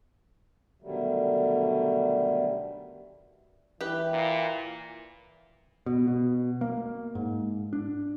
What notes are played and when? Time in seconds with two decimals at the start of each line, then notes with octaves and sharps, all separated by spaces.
0.82 B2 D3 D#3 F#3 G3 A3
3.81 E3 G4 B4
4.11 A#2
5.86 B2
6.08 B2
6.61 A#3
7.15 G#2
7.73 D4